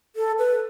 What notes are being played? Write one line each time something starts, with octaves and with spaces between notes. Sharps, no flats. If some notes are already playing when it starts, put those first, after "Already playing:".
A4
B4